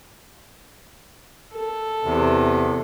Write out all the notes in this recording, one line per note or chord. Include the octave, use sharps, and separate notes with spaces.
A4
E2 C3